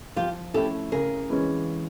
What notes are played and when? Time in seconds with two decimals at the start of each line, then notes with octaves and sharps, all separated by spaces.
0.16 F3 F4 G4
0.54 A3 C#4 E4 G4 A4
0.92 C#3 G#4 A#4
1.30 E3 G#3 C#4